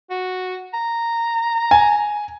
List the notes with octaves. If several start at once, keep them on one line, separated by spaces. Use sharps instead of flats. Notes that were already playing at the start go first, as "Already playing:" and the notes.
F#4
A#5
G#5